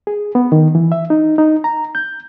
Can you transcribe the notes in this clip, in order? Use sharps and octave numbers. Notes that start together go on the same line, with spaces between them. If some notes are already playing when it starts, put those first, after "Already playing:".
G#4
B3
D#3
E3
E5
D#4
D#4
A#5
G6